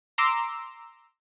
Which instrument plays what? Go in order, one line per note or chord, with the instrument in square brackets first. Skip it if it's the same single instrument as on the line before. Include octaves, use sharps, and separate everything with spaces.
[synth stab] A#5 C6 D6 E6